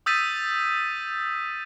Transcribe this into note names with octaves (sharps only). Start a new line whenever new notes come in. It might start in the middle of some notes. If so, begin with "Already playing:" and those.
D#6 E6 G6 A6 B6 D#7